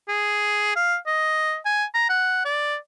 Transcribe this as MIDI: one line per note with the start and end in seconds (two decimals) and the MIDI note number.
0.08 0.76 68
0.76 0.96 77
1.06 1.57 75
1.65 1.85 80
1.94 2.05 82
2.09 2.40 78
2.45 2.76 74